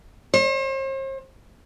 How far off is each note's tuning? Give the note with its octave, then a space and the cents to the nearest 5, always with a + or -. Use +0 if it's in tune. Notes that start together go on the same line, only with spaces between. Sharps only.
C5 +45